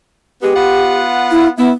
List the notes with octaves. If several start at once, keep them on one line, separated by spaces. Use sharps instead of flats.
G#3 B3 G4
B3 F4 F#5
E4
B3 E4